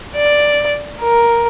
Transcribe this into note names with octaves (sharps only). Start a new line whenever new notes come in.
D5
A#4